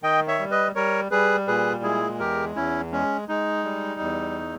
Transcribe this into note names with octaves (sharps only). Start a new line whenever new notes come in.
D#3 D#5 G5
C#5 E5
G3
B4 D#5
G3 A#4 C#5
G3 G#4 B4
A#2 G#4 B4
G#3 E4 G#4
E2 G4 A#4
E2 C#4 E4
G#3 C#4
G#3 D#4
G3
E2